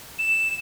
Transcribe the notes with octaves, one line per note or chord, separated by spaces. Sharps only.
E7